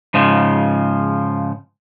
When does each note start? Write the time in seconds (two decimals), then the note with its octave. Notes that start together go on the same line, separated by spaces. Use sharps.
0.14 G#2 C#3 F3